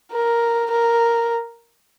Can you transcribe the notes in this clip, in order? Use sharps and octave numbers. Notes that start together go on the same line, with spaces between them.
A#4
A#4